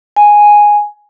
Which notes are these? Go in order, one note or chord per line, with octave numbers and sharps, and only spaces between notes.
G#5